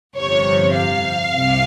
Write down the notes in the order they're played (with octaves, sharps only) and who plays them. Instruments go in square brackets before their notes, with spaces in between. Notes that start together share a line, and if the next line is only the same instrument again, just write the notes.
[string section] G1 F2 C3 C#5
F5
C2 C3